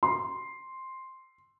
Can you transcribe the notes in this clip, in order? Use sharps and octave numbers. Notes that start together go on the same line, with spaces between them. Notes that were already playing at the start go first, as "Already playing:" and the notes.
C6